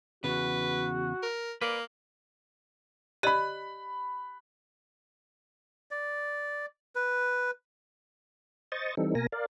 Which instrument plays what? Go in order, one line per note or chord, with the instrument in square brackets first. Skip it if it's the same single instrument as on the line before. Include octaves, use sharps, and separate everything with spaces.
[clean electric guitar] E2 C#3 [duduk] F#4 [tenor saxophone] B4
[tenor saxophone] A#4
[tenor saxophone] A#3 [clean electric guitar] B4 D5
[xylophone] G4 D5 D#5 [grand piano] B5 F#6
[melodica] D5
B4
[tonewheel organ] C5 D#5 C#6 D#6 A6
E3 G3 C4 D#4 A4
B2 A#3 A#4 G#5 A#6
A#4 D5 F5